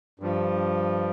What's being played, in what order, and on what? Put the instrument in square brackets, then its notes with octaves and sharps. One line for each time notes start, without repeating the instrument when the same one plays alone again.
[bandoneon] G2 F3